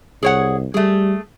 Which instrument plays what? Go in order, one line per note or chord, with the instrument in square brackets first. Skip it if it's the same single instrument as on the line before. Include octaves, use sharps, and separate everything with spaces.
[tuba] C2 [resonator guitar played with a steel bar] G#4 C#5 F#5
[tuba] G3 [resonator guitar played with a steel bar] A3 G#4